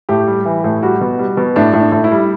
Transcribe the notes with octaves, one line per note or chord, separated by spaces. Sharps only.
A2 G4
G3
E3
A2
G3 F#4
B2
G3
B2
A2 D4
A2
D4
A2
E4
G3